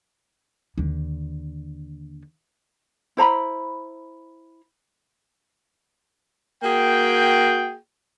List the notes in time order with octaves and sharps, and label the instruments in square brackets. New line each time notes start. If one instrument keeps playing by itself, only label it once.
[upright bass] D#2 D3
[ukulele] E4 C5 A#5 B5
[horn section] A#3 F#4 G#4 G5